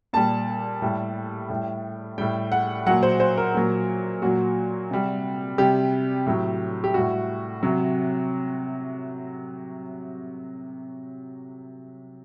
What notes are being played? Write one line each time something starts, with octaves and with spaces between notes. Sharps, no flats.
A#2 G3 A5
A2 G3
A2 G3
A2 G3 G5
F#5
A#2 F#3 F#5
C5
C5
A#4
A#2 F#3
A#2 F#3 F#4
C3 G3
C3 G3 G4
A2 F#3
G4
A2 G3 F#4
C3 F#3